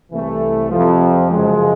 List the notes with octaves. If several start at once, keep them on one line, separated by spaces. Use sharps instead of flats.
C2 C3 E3 A3
F2 C3 F3
F#2 C#3 F3 G#3